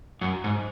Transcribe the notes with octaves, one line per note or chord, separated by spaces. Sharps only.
F#2
G#2